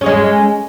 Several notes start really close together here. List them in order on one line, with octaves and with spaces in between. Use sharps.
C#4 G#4 G#3